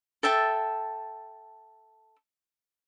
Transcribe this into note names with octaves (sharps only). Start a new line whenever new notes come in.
A4 E5 G5 A5